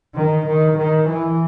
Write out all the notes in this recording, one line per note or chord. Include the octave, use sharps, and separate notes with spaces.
D#3
D#3
D#3
E3